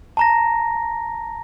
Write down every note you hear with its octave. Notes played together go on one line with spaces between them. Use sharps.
A5 A#5 A#6